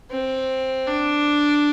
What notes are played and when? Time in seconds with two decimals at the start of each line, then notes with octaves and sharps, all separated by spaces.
0.11 C4
0.87 D4